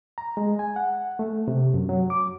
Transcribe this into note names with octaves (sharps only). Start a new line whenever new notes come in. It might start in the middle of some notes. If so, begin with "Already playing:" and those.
A#5
G#3
G#5
F#5
A3
C3
F#2
F#3
D6